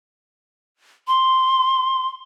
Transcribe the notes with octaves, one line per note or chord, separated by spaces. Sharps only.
C6